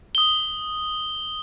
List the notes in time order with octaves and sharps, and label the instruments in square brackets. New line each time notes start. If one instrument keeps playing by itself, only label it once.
[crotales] D#6 G7